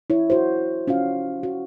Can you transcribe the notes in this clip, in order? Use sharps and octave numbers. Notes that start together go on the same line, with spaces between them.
E4 C#5
F#4 C5
C#4 F4 F#4 F5
F#4